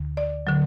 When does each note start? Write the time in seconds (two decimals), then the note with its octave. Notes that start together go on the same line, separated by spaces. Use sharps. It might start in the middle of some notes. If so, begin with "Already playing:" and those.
Already playing: D2 D3
0.17 D5
0.47 D3 F#3